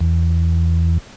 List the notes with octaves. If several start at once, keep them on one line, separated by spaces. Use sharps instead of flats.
E2